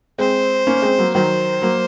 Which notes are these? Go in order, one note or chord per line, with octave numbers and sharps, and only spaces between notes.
G#3 C4 C5
A#3 C#4
G#3 C4
F#3 A#3
D#3 F#3 C5
F#3 A#3